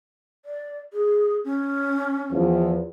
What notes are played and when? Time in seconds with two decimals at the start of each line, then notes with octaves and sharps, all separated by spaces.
0.45 D5
0.93 G#4
1.44 C#4
2.31 E2 F3